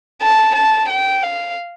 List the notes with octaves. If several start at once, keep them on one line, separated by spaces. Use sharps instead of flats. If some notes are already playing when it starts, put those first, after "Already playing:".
A5
A5
G5
F5